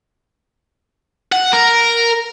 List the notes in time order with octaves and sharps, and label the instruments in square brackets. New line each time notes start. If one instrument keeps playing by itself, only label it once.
[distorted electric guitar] F#5
A#4